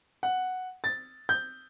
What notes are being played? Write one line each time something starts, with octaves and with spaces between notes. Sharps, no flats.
F#5
A6
G6